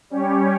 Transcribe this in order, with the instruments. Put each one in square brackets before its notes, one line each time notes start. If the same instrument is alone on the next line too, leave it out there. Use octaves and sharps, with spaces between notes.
[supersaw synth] G3 C#4 G4 C#5